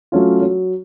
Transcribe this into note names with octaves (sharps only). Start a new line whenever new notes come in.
F#3 A3 C#4 F4
F#3